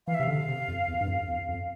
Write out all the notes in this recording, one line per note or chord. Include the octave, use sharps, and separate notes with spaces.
E3 F5
E5
C3
D3 F5
C3
F2
E2
G2
F2
E2
F2